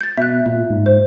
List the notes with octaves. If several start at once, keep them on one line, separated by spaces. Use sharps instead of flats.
G6 A6
B2 E5 F#6
A#2 E5
G#2
C5